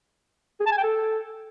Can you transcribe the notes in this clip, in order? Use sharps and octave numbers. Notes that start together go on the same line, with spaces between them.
G#4
A5
G#5
G5
A4